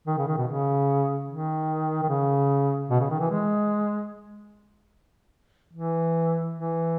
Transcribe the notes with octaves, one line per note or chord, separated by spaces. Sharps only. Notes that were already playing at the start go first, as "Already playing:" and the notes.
D#3
C#3
D#3
B2
C#3
D#3
D#3
C#3
B2
C#3
D#3
E3
G#3
E3
E3